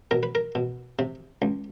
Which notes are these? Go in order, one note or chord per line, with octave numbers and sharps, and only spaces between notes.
B2 A#4
B4
A#4
B2
C3
C#2